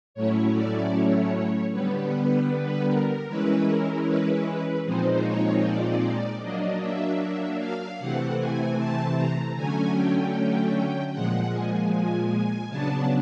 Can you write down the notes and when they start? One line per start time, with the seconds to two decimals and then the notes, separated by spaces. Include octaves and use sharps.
0.15 A2 F#3 A3 C#4 E4 C#5
0.54 D5
0.93 C#5
1.71 D3 G3 B3 B4
2.89 A#4
3.28 E3 G#3 C#4 E4 B4
3.68 A#4
4.07 B4
4.46 B4
4.85 A#2 F3 G#3 C4 D#4 C5
5.25 C#5
5.65 D5
6.42 F#3 A#3 D4 D#5
6.82 E5
7.21 E5
7.60 F5
7.99 C3 E3 A3 C4 F#5
8.38 G#5
8.78 A5
9.17 A#5
9.56 D3 F#3 A3 C#4 G#5
9.95 G5
11.12 A#2 F3 G#3 F#5
11.53 G#5
11.92 G#5
12.31 G#5
12.69 C#3 F#3 B3 D4 A5